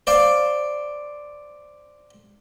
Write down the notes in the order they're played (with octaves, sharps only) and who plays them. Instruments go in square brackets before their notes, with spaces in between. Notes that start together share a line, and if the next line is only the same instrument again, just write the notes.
[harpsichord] C5 D5 F5